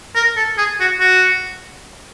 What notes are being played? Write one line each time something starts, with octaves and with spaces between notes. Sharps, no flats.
A#4
A4
G#4
F#4
F#4